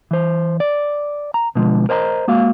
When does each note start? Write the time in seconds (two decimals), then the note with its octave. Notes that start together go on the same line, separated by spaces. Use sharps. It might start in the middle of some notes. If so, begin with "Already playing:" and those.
0.11 E3 C5
0.60 D5
1.34 A#5
1.55 B2 D3 F3 G#3
1.89 A#4 C5 D#5 G#5 A#5
2.28 G#3 A#3 F#4 F5